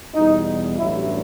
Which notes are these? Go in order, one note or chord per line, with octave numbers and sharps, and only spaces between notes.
E2 B2 G3 D#4
A1 G2 F#3 E4